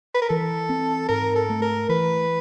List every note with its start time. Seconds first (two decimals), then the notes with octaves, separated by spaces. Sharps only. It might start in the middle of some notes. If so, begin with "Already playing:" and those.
0.14 B4
0.22 A#4
0.29 E3 A4
0.69 C4
1.09 G#2 A#4
1.36 A4
1.49 A3
1.62 A#4
1.89 E3 B4